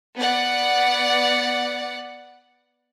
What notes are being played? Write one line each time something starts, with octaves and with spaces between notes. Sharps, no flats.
B3 D5 F#5